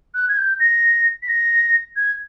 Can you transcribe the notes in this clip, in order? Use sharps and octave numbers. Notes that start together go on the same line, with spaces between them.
F#6
G#6
G6
A#6
B6
A#6
G#6